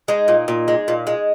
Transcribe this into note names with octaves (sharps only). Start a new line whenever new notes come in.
G#3 D#4
A#2
A#2
G#3
A#2
G#3